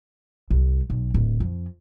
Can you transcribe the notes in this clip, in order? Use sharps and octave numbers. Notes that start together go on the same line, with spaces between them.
C2
B1
D1
F2